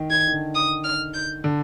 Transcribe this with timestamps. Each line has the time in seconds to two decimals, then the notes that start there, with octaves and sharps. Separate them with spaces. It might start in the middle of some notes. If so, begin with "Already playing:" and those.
Already playing: D#3
0.10 D#3 G#6
0.27 D#3
0.32 D3
0.55 D#6
0.84 F6
1.14 G6
1.44 D3